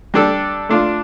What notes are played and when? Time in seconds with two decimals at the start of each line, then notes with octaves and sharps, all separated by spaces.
0.14 G3 D4 A4
0.69 A3 D4 F4